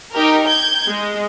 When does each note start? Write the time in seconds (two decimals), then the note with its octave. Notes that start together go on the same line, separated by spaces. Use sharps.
0.14 D#4 G4 A#4
0.46 G6 G#6
0.88 G#3